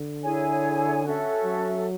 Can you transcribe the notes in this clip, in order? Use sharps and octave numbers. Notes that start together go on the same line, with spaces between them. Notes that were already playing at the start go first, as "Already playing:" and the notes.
Already playing: D3
E4 G#4 C#5 G#5
C#4 F#4 A4 E5
F#3